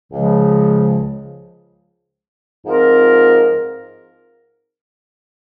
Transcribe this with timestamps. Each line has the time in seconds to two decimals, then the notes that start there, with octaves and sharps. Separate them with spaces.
0.12 C#2 C#3 F3 G#3
2.65 G#2 F3 C4 F4 A#4